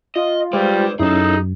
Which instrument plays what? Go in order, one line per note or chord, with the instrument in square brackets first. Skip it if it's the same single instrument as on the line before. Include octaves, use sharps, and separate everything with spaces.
[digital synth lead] F4 [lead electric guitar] D#5
[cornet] G3 [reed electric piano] G#3 C5 [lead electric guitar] B4 D5
[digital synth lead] F#2 [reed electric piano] C#4 E4 [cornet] D#4 [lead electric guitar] G#4 A4